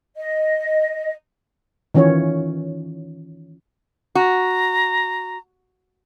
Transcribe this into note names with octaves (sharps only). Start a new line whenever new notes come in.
D#5
D#3 E3 C#4 F4 C#5
F#4 A#5